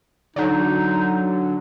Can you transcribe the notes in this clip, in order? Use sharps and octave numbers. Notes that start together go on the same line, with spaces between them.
D3 F#3 D#4